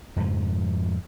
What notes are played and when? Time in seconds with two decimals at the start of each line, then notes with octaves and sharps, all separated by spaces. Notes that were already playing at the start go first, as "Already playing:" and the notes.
0.16 F2 G#2 C#3 F3